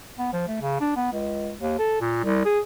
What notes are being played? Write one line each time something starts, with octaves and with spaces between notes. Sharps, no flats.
B3
F3
A3
C#3
D4
B3
C#2
D#2
A4
A#2
C2
G#4